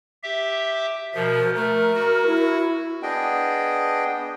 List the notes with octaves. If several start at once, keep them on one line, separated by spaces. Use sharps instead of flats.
G4 E5
B2 F3 A#4
A3 A#4
F#4
E4
B3 D4 G#4 D#5 G5